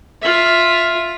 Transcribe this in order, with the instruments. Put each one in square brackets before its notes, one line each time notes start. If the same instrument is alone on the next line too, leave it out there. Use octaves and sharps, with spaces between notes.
[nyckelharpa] F4 E5